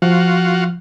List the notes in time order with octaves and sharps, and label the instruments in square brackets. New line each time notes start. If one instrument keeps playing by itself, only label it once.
[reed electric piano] F3 [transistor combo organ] F4 F#4